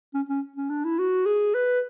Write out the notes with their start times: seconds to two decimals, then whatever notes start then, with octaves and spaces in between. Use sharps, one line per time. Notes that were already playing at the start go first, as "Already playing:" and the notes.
0.14 C#4
0.29 C#4
0.56 C#4
0.70 D4
0.84 E4
0.98 F#4
1.26 G#4
1.54 B4